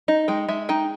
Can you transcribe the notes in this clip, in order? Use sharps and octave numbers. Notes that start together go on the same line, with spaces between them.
D#4
G#3 G5
G#3 E5
D#4 G5